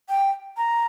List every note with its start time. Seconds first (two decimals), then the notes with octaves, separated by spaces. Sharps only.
0.09 G5
0.57 A#5